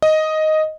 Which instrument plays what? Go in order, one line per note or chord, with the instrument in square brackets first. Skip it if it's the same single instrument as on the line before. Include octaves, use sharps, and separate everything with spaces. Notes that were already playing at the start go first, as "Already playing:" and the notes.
[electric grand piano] D#5